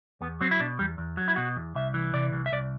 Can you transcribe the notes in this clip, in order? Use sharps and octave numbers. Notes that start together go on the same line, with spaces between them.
E2 B3
F#3 C4
E4
B2 D4
E2 G3
E2
F#3
E4
B2 F#4
E2
C2 E5
E3
C3 D5
C2
E5
C2 D5